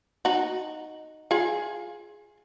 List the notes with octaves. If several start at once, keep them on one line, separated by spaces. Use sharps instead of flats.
D#4 F#4
F4 G#4